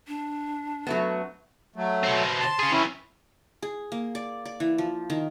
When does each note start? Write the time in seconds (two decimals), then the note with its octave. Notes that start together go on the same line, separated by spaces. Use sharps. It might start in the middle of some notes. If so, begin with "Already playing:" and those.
0.08 D4
0.87 F#3 A3 B3
1.76 F#3 A3
2.04 B2 C4
2.40 A5 C6
2.59 C#4 G#4
2.72 C3 E3 C#4 E4
3.62 G#4
3.92 A#3
4.15 D5
4.45 D5
4.60 E3
4.78 F3
5.10 D#3